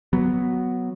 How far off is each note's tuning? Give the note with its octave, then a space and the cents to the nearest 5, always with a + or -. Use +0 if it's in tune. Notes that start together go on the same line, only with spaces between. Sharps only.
F#3 +0 B3 +0